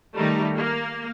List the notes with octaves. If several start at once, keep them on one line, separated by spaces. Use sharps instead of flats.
D#3 G3 A3 D#4
A#3